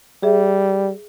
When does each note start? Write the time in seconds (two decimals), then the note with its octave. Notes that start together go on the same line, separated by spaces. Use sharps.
0.23 G3 G#4 E5